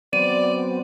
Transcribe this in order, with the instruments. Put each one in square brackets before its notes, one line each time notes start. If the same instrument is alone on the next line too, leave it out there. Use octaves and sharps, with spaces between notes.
[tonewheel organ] F#3 B3 C4 [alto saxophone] D5 [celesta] D#7